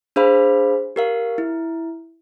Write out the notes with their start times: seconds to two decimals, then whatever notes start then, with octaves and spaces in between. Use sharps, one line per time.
0.16 D4 G#4 C5 F5 B5
0.96 G4 A#4 F5
1.38 E4